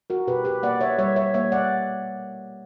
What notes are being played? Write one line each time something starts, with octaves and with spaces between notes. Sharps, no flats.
F#4 A#4
B2 G4 B4
G4 B4
A#3 D5 F#5
C#5 E5
G3 C#5 E5
C#5 E5
A#3 C#5 E5
D5 F#5